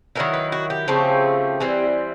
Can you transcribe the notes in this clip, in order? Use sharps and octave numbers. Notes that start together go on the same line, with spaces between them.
D#3 F#3 B3 E4 A#4
B4
F#4
G4
C#3 F3 A3 C4
E3 G3 C4